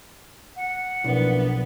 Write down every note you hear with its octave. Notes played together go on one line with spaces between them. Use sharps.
F#5
B1 F3 A#3 B3 D4 E4